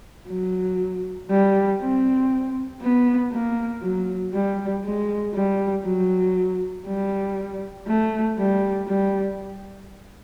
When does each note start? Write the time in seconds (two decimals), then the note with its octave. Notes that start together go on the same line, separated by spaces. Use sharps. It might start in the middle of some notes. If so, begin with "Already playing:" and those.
0.28 F#3
1.31 G3
1.81 C4
2.82 B3
3.32 A#3
3.82 F#3
4.34 G3
4.84 G#3
5.34 G3
5.85 F#3
6.86 G3
7.88 A3
8.38 G3
8.88 G3